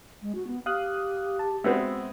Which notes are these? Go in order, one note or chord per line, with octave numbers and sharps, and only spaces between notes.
G#3
F#4
B3
G4 F5 D#6 F#6
A5
G#3 B3 C4 F#4 E5